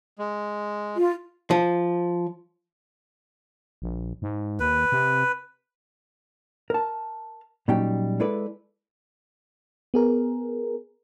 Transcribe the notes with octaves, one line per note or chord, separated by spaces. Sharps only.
G#3
F4
F3
A#1
G#2
D#2 B4
C3
A#4 A5
A#2 F#3 G3 C#4 D#4 G5
G#3 E4 A4 B4 D5
B3 G#4 A#4